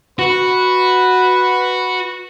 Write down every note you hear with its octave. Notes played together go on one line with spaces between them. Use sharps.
F#4 B4